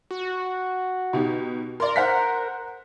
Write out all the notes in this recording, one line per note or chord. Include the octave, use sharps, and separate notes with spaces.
F#4
B2 D#4 G4
A#4 D5 C6
C5 F#5 B6